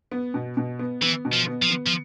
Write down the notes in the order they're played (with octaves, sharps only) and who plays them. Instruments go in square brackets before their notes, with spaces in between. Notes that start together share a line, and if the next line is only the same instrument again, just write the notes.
[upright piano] B3
B2
B2
B3
[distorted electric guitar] E3 [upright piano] B3
[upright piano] B2
[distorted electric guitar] F3
[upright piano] B3
[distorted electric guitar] F3
[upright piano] B3
[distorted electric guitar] F3